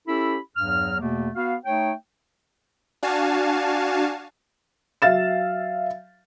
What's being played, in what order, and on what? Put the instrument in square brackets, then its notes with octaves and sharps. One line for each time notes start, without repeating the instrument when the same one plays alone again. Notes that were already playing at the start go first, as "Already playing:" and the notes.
[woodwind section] C#4 E4 G4 A4 B5
E2 G2 F#3 F6
E2 B2 A3 A#3
B3 F#4 F5
A3 D#4 C#5 G5
[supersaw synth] D4 F#4 F5 G#5 A5
[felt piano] F#3 E5 F5 A6 E7